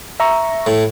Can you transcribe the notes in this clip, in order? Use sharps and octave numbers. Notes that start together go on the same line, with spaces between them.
E5 A#5 C#6
A2